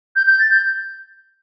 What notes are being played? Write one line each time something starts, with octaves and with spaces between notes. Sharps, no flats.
G6
G6
A6
G6